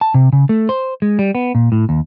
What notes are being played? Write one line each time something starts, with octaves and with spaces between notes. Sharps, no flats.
A5
C3
C#3
A3
C5
G#3
G3
B3
A#2
A2
D#2